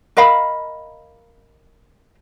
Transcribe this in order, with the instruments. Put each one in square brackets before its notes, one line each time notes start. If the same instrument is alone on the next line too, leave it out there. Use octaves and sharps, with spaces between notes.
[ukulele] A#4 D#5 F5 B5